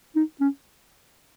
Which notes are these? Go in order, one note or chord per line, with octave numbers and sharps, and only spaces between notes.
D#4
C#4